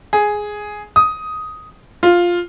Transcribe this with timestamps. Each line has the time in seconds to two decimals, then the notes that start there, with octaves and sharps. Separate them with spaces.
0.13 G#4
0.96 D#6
2.03 F4